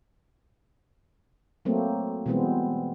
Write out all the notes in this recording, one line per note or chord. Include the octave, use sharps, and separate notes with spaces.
F#3 A3 A#3 C4
B2 E3 G3 G#3 B3 C4